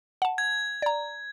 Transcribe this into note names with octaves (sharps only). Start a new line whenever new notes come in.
F#5 A5
G#6
D5 A#5